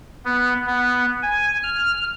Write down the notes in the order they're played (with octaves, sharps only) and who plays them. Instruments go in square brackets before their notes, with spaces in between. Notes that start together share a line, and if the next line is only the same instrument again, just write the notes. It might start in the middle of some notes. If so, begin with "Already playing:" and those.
[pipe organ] B3
B3
G#5
F6